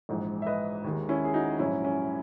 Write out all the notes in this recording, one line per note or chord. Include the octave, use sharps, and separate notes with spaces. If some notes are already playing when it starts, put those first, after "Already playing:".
A#1 G#2 E3 G#3
E5
B4 D#5
D#2 D#3 G#3
C#4 E4
G#4
D#4 F#4
A#1 G#2 F#3 C#4 E4
C#4